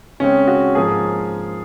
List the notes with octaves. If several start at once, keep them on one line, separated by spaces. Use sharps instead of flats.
C#3 G#3 C4 C#4
F#4
G#2 F3 A#3 G#4